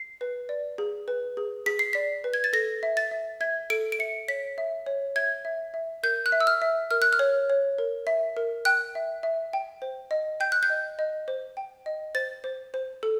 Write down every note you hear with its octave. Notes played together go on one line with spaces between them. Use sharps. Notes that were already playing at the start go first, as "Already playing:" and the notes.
Already playing: C7
B4
D5
G#4
B4
G#4
G#4 B6
C7
D5 B6
B4
G#6
A6
A4 A#6
E5
A6
E5
E5 G#6
A4 D7
D7
E5 C#7
C#5 B6
E5
C#5
E5 G#6
E5
E5
A#4 G6
F#6
E5
E6
F6
E5
A#4 F6
F#6
F6
C#5
C#5
A#4
E5
A#4
G5 F#6
E5
E5
G5
C5
D#5
G5 G6
F#6
G6
D#5
D#5
C5
G5
D#5
C5 A6
C5
C5
A4